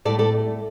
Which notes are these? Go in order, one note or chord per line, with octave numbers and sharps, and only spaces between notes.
A2 A3 A4 D5
A4 D5